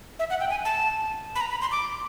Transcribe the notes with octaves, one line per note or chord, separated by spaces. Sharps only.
E5
F#5
G5
G#5
A5
B5
A#5
B5
C6
D6